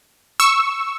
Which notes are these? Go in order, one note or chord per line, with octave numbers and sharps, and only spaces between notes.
C#6 E6